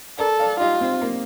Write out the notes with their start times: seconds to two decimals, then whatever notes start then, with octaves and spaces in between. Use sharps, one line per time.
0.19 A4 A#4 D5
0.40 D5 F5
0.60 D#4 F4 G4
0.81 C4
1.02 A#3